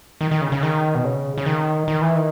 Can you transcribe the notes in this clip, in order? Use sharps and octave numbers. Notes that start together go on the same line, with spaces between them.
D#3
D#3
C#3
C#3
D#3
B2
C#3
C#3
D#3
D#3
E3
D#3